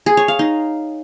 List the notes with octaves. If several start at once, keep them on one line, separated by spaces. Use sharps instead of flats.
G#4
C#5
F5
D#4